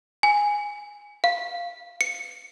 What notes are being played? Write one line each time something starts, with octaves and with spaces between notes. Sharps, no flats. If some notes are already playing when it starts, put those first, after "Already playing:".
G#5
F5
C#7